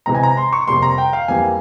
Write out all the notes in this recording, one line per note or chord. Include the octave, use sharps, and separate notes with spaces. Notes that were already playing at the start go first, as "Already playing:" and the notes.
C3 E3 G#3 A#5
G#5
A#5
C6
C#6
F2 C3 G3 A#3 C6
A#5
G5
F5
F2 E3 G3 A#3 G#5